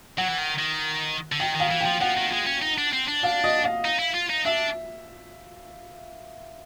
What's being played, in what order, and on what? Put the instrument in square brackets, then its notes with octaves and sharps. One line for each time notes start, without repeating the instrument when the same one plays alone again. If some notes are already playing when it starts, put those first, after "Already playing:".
[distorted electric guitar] F#3 [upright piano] F#5
[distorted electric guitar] E3
D#3
D#3
D3
[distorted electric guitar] D#3 [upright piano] G5
[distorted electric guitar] D#3 [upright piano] F5
[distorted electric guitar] E3
[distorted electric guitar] F3 [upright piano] G5
[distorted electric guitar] F3 [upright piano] F#5
[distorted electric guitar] D#3
G#3
C#4
D#4
D4
C4
D4
[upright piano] F5
D#5
F5
[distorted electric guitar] D#4
E4
F4
D#4
[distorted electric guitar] D4 [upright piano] E5